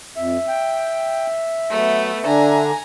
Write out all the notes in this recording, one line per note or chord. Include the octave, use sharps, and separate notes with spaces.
F2 E5
G5
F#3 A3 B3
D3 D4 G#5 A#5